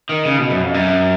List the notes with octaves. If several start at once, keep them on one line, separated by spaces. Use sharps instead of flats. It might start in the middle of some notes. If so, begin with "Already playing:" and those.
D#3
C#3
B2
F#2
F2
F#2